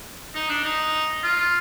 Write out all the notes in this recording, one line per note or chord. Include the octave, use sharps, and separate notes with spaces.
D#4
D4
D#4
F4